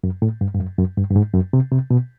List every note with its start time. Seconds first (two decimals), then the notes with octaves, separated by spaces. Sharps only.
0.04 F#2
0.22 A2
0.41 G2
0.54 G2
0.60 F#2
0.78 F#2
0.97 G2
1.11 G2
1.16 G#2
1.34 F#2
1.53 C3
1.72 C3
1.90 B2